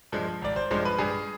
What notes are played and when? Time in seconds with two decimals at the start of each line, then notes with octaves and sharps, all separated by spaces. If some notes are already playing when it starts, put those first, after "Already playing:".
0.12 G2 F3 G#3
0.42 G#1 D5
0.56 C5
0.71 G2 F3 G#3 C5
0.85 B4
0.98 G2 G#4